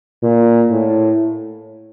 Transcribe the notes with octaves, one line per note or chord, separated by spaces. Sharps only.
A#2
A2